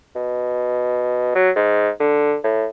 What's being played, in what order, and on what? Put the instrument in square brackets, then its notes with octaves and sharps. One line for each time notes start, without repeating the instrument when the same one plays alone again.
[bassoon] B2
F#3
G#2
D3
A2